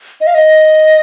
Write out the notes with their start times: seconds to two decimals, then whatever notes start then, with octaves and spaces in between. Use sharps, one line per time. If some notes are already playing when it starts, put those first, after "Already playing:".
0.21 D#5
0.27 F5
0.34 D#5